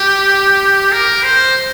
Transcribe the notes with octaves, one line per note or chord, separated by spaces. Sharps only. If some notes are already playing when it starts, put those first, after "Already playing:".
Already playing: G4
A#4
C5